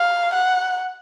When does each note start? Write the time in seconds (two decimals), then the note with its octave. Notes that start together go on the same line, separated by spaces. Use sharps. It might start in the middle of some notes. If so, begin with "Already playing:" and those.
Already playing: F5
0.34 F#5